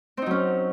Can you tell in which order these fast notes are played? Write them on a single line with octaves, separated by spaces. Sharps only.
C4 D#4 F#3 C#4